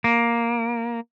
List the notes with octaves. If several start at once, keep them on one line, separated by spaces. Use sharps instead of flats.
A#3